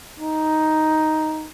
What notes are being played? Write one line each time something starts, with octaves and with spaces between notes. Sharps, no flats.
D#4